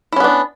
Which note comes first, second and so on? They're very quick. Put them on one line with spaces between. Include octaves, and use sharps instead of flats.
E4 C#4 B3 D4